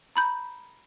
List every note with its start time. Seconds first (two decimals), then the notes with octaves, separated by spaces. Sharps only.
0.16 A#5 B5 G6